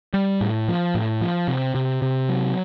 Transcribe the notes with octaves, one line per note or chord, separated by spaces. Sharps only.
G3
A2
F3
A2
F3
C3
C3
C3
F#3